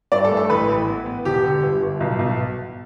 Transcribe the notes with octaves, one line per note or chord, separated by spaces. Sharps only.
G2 D5
A4
A3
A4
A1 B4
A1
B3
B3
E1 G4
D3
G1
G1
B1
B1